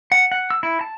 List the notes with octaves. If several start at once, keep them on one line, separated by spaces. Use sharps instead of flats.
F#5
F#5
E6
E4
A5